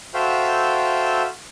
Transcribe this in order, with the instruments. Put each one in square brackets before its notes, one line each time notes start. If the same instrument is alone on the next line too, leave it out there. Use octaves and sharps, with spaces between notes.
[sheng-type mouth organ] F#4 A4 C5 E5 F5 G5